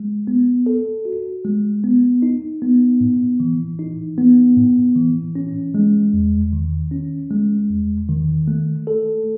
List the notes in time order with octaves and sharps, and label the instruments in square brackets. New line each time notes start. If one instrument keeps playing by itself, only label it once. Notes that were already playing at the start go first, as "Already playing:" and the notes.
Already playing: [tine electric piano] G#3
B3
A4
F#4
G#3
B3
D#4
B3
A2
E3
D#4
B3
A2
E3
C#4
G#3
E2
D#3
C#4
G#3
E2
D#3
A3
A4